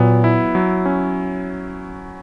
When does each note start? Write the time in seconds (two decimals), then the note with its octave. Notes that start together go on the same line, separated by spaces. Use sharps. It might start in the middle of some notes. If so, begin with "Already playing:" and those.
Already playing: A#2 F#3 B3
0.24 E4
0.55 F#3
0.86 C#4